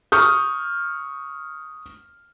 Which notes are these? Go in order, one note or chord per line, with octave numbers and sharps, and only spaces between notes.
C#6 D#6 F6 G6